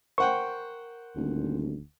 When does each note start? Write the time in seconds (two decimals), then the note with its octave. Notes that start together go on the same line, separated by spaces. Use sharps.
0.18 A#4 C5 F#5 G5 C#6
1.16 D#1 D2